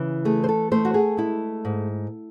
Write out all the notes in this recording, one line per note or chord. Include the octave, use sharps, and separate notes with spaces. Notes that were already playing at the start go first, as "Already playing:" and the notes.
Already playing: C#3 E3
A3 G#4
C5
A4
A3 C5
F#4
G#4
G#3 E4
G#2